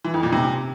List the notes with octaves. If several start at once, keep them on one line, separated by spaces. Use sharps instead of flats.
E3
F2
A#2
C3